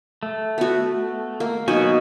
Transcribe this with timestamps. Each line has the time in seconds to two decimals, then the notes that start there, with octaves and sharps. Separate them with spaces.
0.23 A3
0.58 B3 F#4
1.40 A#3
1.68 B2 F#3 A#3 D#4 F#4 G#5